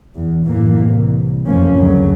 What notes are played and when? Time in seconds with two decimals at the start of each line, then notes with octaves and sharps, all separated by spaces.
0.15 E2
0.44 F#1 A2 E3 A#3
0.79 C2
1.46 F#1 F2 C3 F3 A#3 C#4
1.77 D2 C#3 F#3